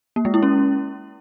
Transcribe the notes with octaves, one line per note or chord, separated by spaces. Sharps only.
A#3
G#3
E4
C#4